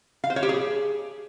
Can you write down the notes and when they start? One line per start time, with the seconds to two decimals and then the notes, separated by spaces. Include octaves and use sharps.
0.24 F5
0.30 C5
0.36 C#5
0.43 G4
0.49 G#4